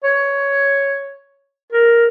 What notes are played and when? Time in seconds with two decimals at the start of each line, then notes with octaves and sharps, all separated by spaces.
0.04 C#5
1.72 A#4